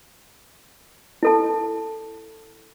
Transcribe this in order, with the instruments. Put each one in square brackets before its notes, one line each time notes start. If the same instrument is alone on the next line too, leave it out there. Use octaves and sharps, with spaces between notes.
[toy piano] E4 A4 A5